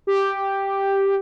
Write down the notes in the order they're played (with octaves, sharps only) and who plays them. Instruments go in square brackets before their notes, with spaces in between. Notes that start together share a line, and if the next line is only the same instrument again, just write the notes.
[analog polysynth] G4